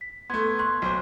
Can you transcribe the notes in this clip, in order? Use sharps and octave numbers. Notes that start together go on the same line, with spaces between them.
B6
A3 B3 C6 G#6
C6 C#6 F#6
B1 C5